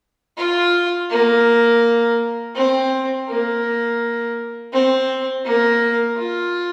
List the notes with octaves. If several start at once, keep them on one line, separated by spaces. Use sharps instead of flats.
F4
A#3
C4
A#3
C4
A#3
F4